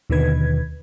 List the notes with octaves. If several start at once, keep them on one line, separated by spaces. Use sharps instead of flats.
D#2 B2 D3 D#3 B4 G#6